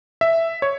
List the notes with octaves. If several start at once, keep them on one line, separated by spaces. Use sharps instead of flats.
E5
C#5